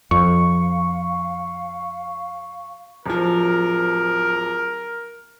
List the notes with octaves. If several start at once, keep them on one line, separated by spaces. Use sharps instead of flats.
F2 F5 C#6
D1 F3 A#4